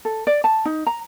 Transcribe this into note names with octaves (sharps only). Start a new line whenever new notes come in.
A4
D5
A5
D#4
A#5